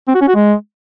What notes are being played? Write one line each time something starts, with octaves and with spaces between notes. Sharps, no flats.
C4
F#4
C#4
F#4
G#3